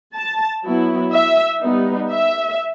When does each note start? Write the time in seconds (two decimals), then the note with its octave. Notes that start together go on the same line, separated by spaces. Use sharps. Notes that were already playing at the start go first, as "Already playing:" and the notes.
0.15 A5
0.64 F#3 B3 E4
1.13 E5
1.60 G3 B3 D#4
2.10 E5